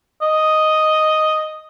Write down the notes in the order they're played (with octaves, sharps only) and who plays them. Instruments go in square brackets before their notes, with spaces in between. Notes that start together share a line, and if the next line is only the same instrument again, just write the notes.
[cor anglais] D#5